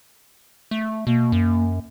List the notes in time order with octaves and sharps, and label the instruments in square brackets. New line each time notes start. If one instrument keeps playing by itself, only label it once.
[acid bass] A3
[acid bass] B2 [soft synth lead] A#3
[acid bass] F#2